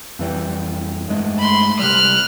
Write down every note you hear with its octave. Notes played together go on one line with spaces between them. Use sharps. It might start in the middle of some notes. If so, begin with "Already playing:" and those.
F2 E3 G3
G2 G#3 A3
B5 C6
C3 G3 F6 F#6